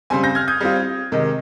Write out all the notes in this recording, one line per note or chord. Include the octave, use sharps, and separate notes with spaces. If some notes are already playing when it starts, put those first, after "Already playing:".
C#3 G3 C4 G#5 C6
G6 A#6
F6 G#6
D#6 G6
G3 C4 F4
C3 D#3 G#3